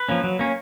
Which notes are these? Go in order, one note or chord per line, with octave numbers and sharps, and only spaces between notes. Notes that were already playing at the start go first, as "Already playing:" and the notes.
Already playing: B4
F3 A#3 C#4
F#3
A#3 C#4